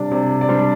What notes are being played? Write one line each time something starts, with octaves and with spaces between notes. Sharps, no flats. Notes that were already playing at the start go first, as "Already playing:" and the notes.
Already playing: C3 G3 D4 D5
C3 D5
D5
G3 D4 C5